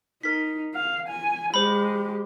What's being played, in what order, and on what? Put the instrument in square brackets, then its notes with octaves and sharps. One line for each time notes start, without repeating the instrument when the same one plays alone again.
[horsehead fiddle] D#4 [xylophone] A#4 B6
[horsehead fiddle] F5
G#5
[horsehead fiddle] G#3 G4 [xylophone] C5 B5